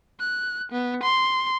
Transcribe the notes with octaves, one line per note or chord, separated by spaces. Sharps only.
F#6
B3
C6